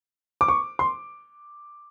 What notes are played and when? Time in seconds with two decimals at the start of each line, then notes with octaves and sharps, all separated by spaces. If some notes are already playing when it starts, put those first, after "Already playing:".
0.41 D6
0.48 C#6
0.79 C6